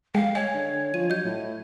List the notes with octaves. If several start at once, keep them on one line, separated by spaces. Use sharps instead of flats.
G#3 F5 G5
C#5 D#5 G#5
D3
F3 D#7
F#3 D#5 G6
A2